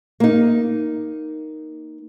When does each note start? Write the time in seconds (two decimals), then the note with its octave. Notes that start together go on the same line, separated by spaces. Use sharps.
0.20 A#3 D#4